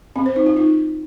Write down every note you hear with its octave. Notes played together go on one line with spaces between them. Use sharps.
C4
C5
D#4
F4
D#4